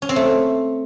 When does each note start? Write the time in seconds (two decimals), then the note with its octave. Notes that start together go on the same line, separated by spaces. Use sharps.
0.02 C#4
0.09 C4
0.16 A3